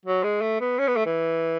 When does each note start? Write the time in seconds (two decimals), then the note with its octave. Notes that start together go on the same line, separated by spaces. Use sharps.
0.05 F#3
0.23 G#3
0.41 A3
0.61 B3
0.79 C#4
0.88 B3
0.96 A3
1.06 E3